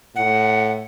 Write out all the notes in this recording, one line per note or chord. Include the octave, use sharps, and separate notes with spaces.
A2 F#5